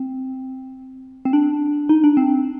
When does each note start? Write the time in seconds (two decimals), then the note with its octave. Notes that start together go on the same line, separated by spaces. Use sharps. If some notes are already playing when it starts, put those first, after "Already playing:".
Already playing: C4
1.25 C4
1.33 D4
1.89 D#4
2.04 D4
2.17 C4